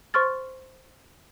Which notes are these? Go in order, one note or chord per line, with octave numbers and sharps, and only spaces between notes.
C5 C6 C#6 F6 A6